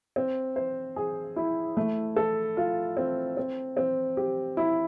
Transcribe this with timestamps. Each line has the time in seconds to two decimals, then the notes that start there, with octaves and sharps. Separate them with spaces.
0.16 C4
0.56 C5
0.96 G#4
1.36 E4
1.77 A3
2.16 A4
2.57 F4
2.97 C4
3.37 C4
3.77 C4
4.17 G4
4.57 E4